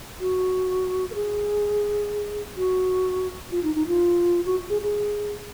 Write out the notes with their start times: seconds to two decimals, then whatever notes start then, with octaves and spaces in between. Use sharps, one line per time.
0.20 F#4
1.11 A#4
1.15 G#4
2.57 F#4
3.52 F4
3.63 D#4
3.75 D#4
3.88 F4
4.46 F#4
4.70 G#4
4.82 G#4